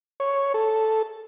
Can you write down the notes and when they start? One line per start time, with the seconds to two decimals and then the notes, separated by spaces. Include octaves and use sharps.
0.20 C#5
0.54 A4